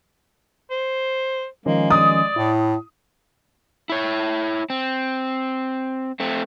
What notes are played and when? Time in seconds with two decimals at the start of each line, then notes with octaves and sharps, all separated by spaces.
0.70 C5
1.66 D#3 F3 G#3 A#3 C#4
1.90 D5 D#6
2.36 A2 E4
3.89 E4 C#5
4.70 C4
6.20 A3 C4